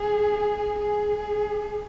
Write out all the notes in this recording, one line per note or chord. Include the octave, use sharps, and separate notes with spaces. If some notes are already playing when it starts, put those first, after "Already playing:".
Already playing: G#4
G#4